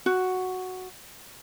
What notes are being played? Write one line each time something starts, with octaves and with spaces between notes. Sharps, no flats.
F#4